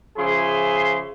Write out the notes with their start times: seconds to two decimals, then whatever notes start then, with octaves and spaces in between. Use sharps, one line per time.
0.17 C#3 F3 G#4 E5 C6